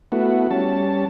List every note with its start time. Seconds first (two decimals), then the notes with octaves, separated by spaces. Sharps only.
0.12 A3 B3 E4 F#4
0.51 G3 C#4 A5